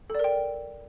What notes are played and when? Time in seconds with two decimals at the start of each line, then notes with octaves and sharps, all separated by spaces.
0.10 A4
0.15 D5
0.19 A#4
0.24 G5